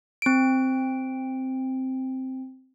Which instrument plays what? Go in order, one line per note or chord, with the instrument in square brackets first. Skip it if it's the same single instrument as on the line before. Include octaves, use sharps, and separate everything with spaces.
[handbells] C4 D7